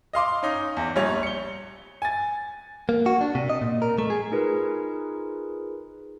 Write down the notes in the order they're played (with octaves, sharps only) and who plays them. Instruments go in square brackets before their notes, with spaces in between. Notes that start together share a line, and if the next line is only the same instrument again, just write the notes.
[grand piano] D#5 F5 C6 D6
C#4 D#4
E2
A#1 G3 C#5 F7
C#7 G7
G#5 A6
[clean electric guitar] A#3
F#4
D4
C3
D#5
A#2
A#4
A3
G#4
[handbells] D#4 F4 G#4 A#4 B4